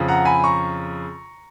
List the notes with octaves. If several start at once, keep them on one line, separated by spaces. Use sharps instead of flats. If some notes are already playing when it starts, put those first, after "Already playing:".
Already playing: F2 C#3
F#5 A#5
G#5 B5
A#5 C#6